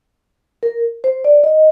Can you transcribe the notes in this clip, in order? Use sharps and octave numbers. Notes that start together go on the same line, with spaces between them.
A#4
C5
D5
D#5